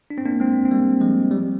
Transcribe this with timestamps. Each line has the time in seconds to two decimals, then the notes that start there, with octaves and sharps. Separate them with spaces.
0.10 D4
0.18 C4
0.25 A#3 D4
0.40 G#3 C4
0.65 C4
0.71 G3 A#3
1.01 F3 G#3
1.31 G3